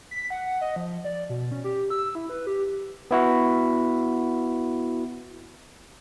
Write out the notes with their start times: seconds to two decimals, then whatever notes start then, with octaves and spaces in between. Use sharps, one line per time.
0.11 B6
0.30 F#5
0.61 D#5
0.76 F3
1.04 D5
1.30 B2
1.52 C#4
1.64 G4
1.90 E6
2.15 E4
2.29 B4
2.47 G4
3.11 B3 E4 F#4